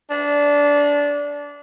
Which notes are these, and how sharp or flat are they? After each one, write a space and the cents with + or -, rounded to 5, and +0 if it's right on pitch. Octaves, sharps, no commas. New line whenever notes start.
D4 -20